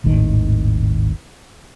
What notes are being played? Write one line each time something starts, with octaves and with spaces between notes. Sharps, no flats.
D#1 G#1 A2 D#3